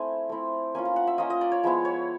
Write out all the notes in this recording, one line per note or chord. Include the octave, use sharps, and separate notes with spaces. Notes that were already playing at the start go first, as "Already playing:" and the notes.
Already playing: A3 C4 E4 G#5
A3 C4 E4
A#3 C#4 F4 G#5
A#5
F#5
E5
A#3 C#4 F4 D#5
D#5
D5
C#5
F3 G#3 B3 E4
C#5